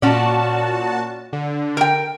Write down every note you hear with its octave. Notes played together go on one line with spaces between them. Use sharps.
A#2 C#4 F#4 D5 A5
D3
A#4 G5